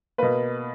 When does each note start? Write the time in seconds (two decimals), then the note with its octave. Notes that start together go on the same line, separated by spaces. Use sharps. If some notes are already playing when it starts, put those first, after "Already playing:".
0.18 B2 A#3 B4